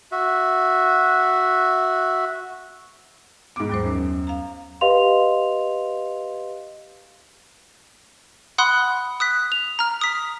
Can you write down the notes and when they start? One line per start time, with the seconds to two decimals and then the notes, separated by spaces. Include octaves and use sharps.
0.12 F#4 E5
3.56 G#2 B3 D6
3.70 D#2 F#3 C5
3.84 F#2
4.27 F5 A#5
4.81 G4 B4 D#5 F5 C6 F7
8.58 F#5 B5 C6 D#6 F#6
9.20 D#6 F#6 B6
9.52 F7
9.79 A#5 F6
10.01 D#6 B6